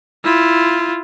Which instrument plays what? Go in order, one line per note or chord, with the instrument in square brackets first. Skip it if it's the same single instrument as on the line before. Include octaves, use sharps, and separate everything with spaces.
[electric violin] E4 F4